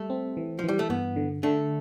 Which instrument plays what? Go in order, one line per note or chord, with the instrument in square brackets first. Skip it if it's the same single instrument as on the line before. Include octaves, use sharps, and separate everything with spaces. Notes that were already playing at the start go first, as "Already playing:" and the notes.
Already playing: [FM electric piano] G3 [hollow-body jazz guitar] A3
[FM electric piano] C4
E3
[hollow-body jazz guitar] F3
[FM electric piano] E3 [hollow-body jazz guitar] G3
[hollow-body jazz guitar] A3
[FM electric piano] G2 [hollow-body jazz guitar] B3
[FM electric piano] D3
[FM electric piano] D3 [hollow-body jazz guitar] A3